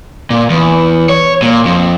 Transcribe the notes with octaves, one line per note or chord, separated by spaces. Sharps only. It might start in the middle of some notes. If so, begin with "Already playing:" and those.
A#2
E2
C#5
A#2
F2